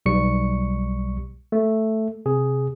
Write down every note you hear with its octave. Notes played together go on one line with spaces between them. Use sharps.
B1 G3 C#6 C#7
A3
C3 G#4